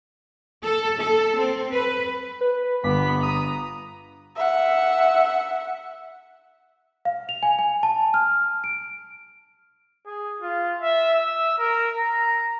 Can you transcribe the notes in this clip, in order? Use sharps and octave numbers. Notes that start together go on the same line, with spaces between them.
A4
A4
C4
B4
B4
G1 B3 D6 B6
A#5 D#6
E5 F#5
F5
F7
G#5
G#5
A5
F6
D7
G#4
F4
E5
E6
A#4
A#5